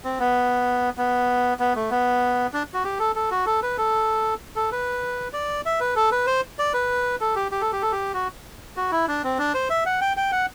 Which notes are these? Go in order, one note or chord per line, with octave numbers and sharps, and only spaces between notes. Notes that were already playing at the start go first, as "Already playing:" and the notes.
C4
B3
B3
B3
A3
B3
D4
F#4
G4
A4
A4
F#4
A4
B4
A4
A4
B4
D5
E5
B4
A4
B4
C5
D5
B4
A4
G4
G4
A4
G4
A4
G4
F#4
F#4
E4
D4
C4
D4
C5
E5
F#5
G5
G5
F#5